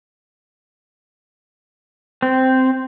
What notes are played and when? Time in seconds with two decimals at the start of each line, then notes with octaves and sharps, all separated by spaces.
2.22 C4